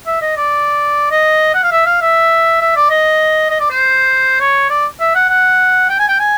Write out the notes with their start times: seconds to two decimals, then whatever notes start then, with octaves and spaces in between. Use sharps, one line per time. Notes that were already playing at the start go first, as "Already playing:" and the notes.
0.06 E5
0.21 D#5
0.37 D5
1.11 D#5
1.54 F#5
1.63 F5
1.71 E5
1.86 F5
2.01 E5
2.61 E5
2.76 D5
2.90 D#5
3.50 D#5
3.60 D5
3.70 C5
4.40 C#5
4.70 D5
5.00 E5
5.15 F#5
5.29 F#5
5.89 G5
5.99 G#5
6.08 G5
6.19 G#5